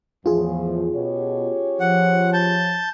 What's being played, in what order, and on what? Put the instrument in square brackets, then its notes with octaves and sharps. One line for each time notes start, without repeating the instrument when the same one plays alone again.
[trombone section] E2 [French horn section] A2 F3 [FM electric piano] F4 G#4
[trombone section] B2 [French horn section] C#4 G4 C#5
[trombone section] F3 [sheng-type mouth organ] F#5
[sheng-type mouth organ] A5 G6